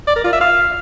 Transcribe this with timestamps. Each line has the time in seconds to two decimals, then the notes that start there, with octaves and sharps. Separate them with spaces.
0.08 D5
0.16 A#4
0.24 F4
0.33 E5
0.41 F5